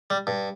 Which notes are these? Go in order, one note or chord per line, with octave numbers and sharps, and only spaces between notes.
G3
G2